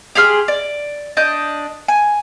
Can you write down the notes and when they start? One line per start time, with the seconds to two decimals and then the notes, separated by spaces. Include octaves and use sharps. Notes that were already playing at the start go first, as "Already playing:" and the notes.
0.15 G4 G#4 C6 F6
0.48 D5
1.17 D4 D#5 G6
1.88 G#5